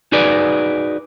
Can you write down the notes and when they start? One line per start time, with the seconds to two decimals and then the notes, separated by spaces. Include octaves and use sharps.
0.12 D#4 F#4 G#4 B4 D5